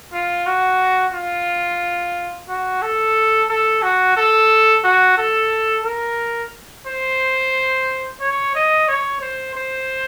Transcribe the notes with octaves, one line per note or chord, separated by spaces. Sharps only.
F4
F#4
F4
F#4
A4
A4
F#4
A4
F#4
A4
A#4
C5
C#5
D#5
C#5
C5
C5